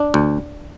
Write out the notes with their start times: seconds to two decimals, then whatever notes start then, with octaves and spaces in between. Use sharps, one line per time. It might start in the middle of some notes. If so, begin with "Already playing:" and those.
Already playing: D4
0.14 D2